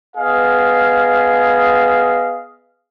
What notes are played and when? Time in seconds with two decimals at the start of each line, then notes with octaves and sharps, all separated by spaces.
0.16 B3 G#4 D#5 F5